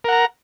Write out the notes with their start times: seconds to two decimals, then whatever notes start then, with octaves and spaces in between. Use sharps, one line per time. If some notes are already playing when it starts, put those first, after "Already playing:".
0.04 A#4
0.08 F#5
0.12 A#5